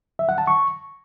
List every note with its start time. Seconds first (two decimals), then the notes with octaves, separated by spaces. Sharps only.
0.19 E5
0.29 F#5
0.38 A5
0.47 C#6